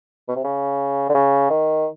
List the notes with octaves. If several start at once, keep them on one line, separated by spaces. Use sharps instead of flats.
B2
C3
C#3
D3
C#3
D#3